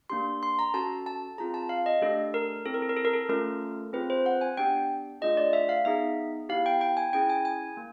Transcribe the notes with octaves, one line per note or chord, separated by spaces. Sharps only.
A#3 D4 G4 C6
C6
A#5
C#4 F#4 A4 A5
A5
C4 F4 G#4 A#5
A5
F5
D#5
A3 D4 G4 A4
A#4
C4 E4 A4
A#4
A4
A#4
A4
A#4
A4
A3 C#4 F4 A4 A#4
C4 F4 G#4 B4
C5
F#5
G#5
B3 D4 G4 G5
A3 D4 F4 G#4 D#5
D5
E5
F5
B3 D#4 G#4 E5
B3 E4 G4 F5
G5
G5
G#5
C#4 E4 G#4 G5
G#5
G#5
A#3